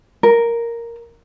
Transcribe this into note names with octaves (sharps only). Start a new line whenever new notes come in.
A#4